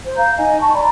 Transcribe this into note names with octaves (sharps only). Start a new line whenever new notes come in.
C5
F5 A#5 G6
D#4 D#5 G#5
A5 C#6
D5 A#5 B5